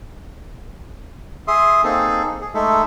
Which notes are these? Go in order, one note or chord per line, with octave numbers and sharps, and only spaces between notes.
G#4 E5 C6 D#6
A#3 C4 D#4 G#4 A4
G#4
G#3 A3 D#4 A4 E5